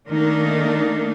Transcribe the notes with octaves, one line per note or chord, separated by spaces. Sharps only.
D#3 A3 A#3 D4 D#4 A#4